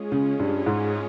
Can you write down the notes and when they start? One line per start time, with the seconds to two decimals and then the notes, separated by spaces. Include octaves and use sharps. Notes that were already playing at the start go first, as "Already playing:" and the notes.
Already playing: G#3 C#4 F4 G#4
0.12 C#3
0.39 G2
0.66 G#2